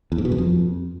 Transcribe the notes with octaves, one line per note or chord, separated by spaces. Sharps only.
E2
G#2
B2
F#2
F2